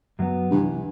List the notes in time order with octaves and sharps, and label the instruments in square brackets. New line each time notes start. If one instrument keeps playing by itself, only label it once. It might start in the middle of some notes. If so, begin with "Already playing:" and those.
[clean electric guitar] F#2 F#3 B3
[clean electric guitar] C2 C3 E3 [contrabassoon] G2